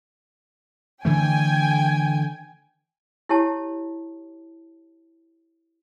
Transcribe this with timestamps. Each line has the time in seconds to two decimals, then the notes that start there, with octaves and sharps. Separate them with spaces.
1.05 D3 E3 A3 G5 G#5
3.29 E4 G4 C#5 A5